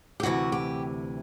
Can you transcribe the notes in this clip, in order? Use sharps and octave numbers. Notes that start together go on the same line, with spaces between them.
G4
D2 C3 E3 F#4
G4